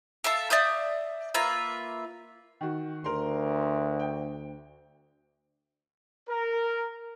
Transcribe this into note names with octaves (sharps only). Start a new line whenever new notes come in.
A4 E5 F5 A5
D5 E5 D#6 G6
A#3 F4 B4 E5
D#3 F#4
D2 A#4 C6
G5
A#4